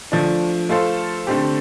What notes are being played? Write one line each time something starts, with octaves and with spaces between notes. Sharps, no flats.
F3 A3 D4
A3 F4 A4 C5
D3 A3 C4 G4